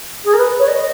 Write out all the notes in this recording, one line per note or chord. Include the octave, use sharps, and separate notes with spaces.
G#4
A#4
B4
C#5
D#5